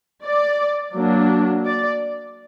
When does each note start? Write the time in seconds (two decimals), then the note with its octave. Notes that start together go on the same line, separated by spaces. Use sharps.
0.24 D5
0.94 F#3 A#3 D4
1.65 D5